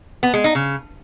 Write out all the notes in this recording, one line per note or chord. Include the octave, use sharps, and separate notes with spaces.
B3
G#3
D#4
C#3